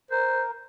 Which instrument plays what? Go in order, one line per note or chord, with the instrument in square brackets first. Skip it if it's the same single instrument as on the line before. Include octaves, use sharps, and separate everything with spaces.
[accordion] A#4 [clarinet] C5